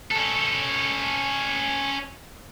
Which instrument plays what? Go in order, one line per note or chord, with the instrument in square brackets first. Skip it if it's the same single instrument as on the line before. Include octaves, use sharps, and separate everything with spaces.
[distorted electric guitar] C#4 A4